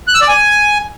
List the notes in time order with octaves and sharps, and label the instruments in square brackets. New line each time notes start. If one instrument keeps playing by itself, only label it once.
[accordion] F#6
E6
D5
G#5